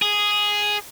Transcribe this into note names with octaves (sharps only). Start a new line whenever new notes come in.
G#4